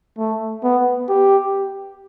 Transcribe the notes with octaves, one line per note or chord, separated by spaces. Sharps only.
A3
B3
G4